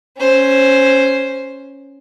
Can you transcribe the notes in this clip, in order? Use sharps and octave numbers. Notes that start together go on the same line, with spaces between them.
C#4 C5